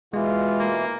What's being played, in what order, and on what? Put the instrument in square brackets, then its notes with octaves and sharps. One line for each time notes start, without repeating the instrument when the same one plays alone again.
[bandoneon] B2 E3 [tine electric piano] G#3 [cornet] F4
[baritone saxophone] A#3